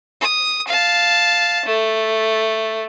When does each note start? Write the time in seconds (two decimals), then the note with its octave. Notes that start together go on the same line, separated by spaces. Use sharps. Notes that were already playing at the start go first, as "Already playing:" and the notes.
0.21 D#6
0.68 F5 A5
1.66 A3